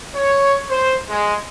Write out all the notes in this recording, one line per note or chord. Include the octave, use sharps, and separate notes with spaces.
C#5
C5
G#3